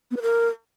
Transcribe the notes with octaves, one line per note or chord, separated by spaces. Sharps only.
B3
B4
A#4